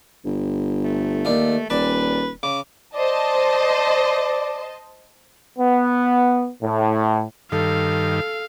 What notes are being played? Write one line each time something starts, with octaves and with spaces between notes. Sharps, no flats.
G1
A3
D#2 D4 F5
D#1 B4 D5 A5
C#3 D6
C5 D5 D#5 A5
B3
A2
G2 D#3 A4 F5